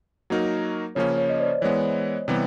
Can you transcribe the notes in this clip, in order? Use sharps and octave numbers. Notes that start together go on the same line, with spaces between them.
F#3 A#3 D#4 F#4 A#4
C#3 F3 A#3 C#4 C#5
C#5
D#5
C5 D5
E3 G#3 B3 C#5
C3 E3 G3 B3